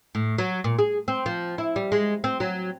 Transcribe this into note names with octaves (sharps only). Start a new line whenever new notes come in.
A2
F#3
A#2
G#4
C4
F3
E4
G3
G#3
C4
F#3